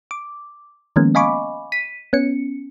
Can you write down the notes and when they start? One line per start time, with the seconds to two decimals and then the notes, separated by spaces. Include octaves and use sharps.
0.11 D6
0.96 D#3 F3 G#3 A#3 B3 C#4
1.15 D#5 F5 G#5 B5 C#6 D6
1.72 B6 D#7
2.13 B3 C#4 C#7